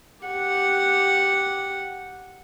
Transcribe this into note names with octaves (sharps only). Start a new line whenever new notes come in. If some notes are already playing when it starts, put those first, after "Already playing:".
G4 F#5